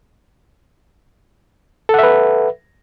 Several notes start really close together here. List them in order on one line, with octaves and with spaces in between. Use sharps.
A4 F#5 E5 B4